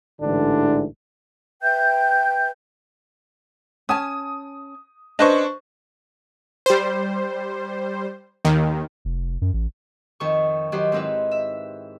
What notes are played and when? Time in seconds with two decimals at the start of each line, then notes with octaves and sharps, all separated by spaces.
0.21 A1 G#2 D3 E3 D4
1.62 B4 E5 G5 G6
3.89 C#4 G#5 A5 D#6
5.19 C#4 D4 B4 C5 D#5 C#6
6.66 G3 C5
8.45 D#2 D#3
9.05 F1
9.42 F#2
9.54 A1
10.20 F2 D#3 C#6
10.72 D#3 F#3 G4 B4 C5
10.92 G#2 C4 D#4 E4 B4
11.31 E5